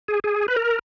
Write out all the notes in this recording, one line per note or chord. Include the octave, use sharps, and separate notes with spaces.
G#4
G#4
B4
A#4